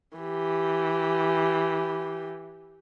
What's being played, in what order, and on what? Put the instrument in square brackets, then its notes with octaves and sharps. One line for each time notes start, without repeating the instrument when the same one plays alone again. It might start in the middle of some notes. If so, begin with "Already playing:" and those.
[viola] E3 G4